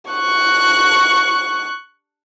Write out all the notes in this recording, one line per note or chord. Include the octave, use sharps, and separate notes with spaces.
C#6 F#6